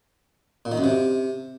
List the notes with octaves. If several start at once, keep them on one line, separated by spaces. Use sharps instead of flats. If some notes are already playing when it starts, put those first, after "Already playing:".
A#2
D#3
F#2
C3